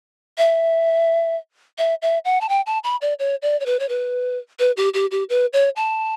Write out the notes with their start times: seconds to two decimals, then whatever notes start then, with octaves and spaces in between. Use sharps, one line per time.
0.38 E5
1.78 E5
2.02 E5
2.25 F#5
2.41 A5
2.49 G5
2.66 A5
2.84 B5
3.02 D5
3.19 C#5
3.42 D5
3.60 C#5
3.66 B4
3.79 C#5
3.89 B4
4.59 B4
4.77 G4
4.94 G4
5.11 G4
5.30 B4
5.53 C#5
5.76 A5